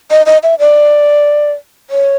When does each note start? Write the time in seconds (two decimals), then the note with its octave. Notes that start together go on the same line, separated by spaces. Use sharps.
0.11 D#5
0.26 D#5
0.43 E5
0.60 D5
1.90 C#5